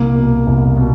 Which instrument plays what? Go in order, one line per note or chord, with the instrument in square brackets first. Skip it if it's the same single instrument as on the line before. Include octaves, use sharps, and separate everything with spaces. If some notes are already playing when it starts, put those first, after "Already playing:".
Already playing: [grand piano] C2 A#3
B2
C2
B2